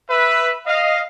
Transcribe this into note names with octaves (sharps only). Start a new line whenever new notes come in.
B4 E5
D#5 F5